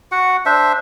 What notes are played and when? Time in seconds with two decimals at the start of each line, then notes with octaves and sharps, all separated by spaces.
0.12 F#4 F#5
0.46 D4 C5 E5